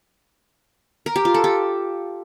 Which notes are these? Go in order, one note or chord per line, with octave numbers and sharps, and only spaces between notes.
A#4
G4
F4
A4
G4